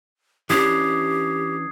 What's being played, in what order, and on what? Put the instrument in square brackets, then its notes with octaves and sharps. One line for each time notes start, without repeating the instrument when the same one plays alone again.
[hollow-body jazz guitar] E3 C#4 D4 [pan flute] G4 [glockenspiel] D#6 G#6 C7